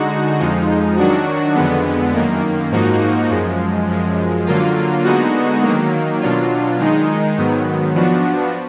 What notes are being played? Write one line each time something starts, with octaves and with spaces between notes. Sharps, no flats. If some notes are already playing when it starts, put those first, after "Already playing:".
Already playing: D3 G#3 D#4 F#4
F2 F3 G#3 D#4
D#3 F#3 D4 F#4
F2 D3 G#3 B3
F#2 D#3 A#3
G#2 F3 A#3 D#4 F#4
F#2 F3 G#3
F#2 F3 G#3
D3 F#3 A#3 F4
D3 G#3 B3 D#4 F#4
D#3 F#3 A#3
B2 F#3 D4 F4
D#3 G#3 D#4
G#2 D#3 F#3 B3
F3 B3 D4 F#4